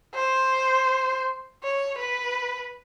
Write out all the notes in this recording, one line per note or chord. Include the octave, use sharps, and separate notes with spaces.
C5
C#5
B4